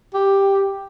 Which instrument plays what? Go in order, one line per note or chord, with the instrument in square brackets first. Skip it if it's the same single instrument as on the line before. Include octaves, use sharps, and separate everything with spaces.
[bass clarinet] G4